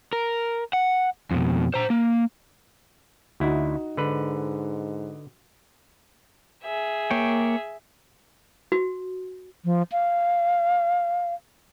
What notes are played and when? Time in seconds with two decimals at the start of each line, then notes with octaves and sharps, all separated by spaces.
0.13 A#4
0.73 F#5
1.31 F2 B2
1.74 C5 A#5
1.90 A#3
3.40 D2 D#4 E4 F#4
3.97 G#2 D3 B4
6.64 G#4 E5
7.11 A#3 C#5 G5
8.72 F#4
9.65 F3
9.92 F5